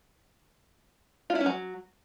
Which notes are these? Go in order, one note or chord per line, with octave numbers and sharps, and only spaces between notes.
F4
E4
C#4
F#3